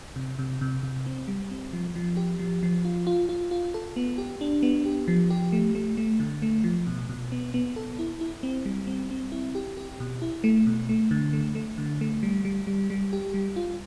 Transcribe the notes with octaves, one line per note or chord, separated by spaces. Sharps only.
C3
C3
C3
C3
C4
G3
C4
F3
F3
G4
F3
F3
F4
F4
F4
F4
A4
B3
G4
D4
B3
G4
F3
G4
A3
A3
A3
D3
A3
F3
B2
B2
B3
B3
A4
E4
E4
C4
G3
C4
C4
E4
G4
G4
B2
E4
A3
B2
A3
D3
A3
A3
D3
A3
G3
G3
G3
G3
G4
G3
F4